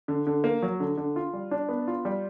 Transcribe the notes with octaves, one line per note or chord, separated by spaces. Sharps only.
D3
D3
A#3
F#3
D3
D3
F4
G3
D4
B3
F4
G3